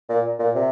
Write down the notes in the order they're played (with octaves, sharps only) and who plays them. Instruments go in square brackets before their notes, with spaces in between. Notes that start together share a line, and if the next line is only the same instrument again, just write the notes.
[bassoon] A#2
A#2
C3